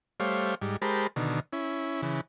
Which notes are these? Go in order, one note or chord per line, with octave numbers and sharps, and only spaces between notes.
G3 A3 C5 C#5 F5
G#2 G3
G#3 G4 A#4 C5 A5 B5
B2 D3 D#3
C#4 E4
C#3 E3